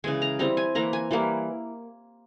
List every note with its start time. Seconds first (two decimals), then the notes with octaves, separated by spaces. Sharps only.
0.04 C#3 E3 G#3 G#5
0.22 A#5
0.39 G3 C4 E4 A#5
0.57 G#5
0.75 E3 A#3 E4 A#5
0.93 G#5
1.11 E3 G3 A#3 E4